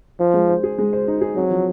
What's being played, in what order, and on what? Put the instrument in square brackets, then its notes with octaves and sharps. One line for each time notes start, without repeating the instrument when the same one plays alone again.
[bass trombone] F3 [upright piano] C5
[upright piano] G#3
C5
G#4
G#3
C5
D#4
G#4
[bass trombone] F#3 [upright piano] C4
[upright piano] F3